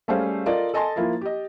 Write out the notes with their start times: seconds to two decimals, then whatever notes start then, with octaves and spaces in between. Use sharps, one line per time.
0.08 G3 A3 C#4 G#4 C5 F5
0.46 F4 A4 A#4 D5 D#5
0.74 A4 D#5 G#5 A5 C6 A6
0.96 F3 A#3 E4 F4
1.21 G4 D#5